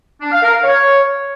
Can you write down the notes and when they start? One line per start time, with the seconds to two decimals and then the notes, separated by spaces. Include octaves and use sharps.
0.21 D4
0.32 F5
0.42 A#4
0.53 F5
0.64 C#5